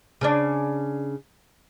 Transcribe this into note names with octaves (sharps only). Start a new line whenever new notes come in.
C#3 C#4 D4